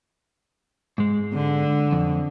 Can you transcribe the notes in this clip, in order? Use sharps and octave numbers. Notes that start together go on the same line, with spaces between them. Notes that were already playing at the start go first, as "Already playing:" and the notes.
G#2 G#3
D3
F2